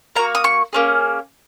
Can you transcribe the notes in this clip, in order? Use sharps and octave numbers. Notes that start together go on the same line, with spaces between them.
A#3 F#4 A#5
D#6
C#6
A#3 C#4 G#4